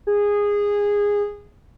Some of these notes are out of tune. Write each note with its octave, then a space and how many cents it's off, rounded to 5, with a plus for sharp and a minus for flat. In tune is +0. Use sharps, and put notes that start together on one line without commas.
G#4 -15